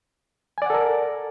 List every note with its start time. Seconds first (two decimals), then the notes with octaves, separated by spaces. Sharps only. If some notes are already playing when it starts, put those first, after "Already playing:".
0.58 G#5
0.62 D5
0.66 F#5
0.70 A4
0.74 A#4